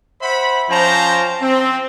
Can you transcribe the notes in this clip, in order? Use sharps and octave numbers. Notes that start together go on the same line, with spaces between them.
C5 E5 F#5 B5
F3 C#4 C5 G5 A5 A#5
C4